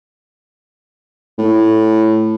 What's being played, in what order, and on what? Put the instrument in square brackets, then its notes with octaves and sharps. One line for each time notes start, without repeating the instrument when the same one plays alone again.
[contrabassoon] A2